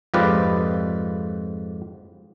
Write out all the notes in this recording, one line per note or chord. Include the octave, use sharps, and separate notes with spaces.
F2 G#2 F4 G4 B4 D5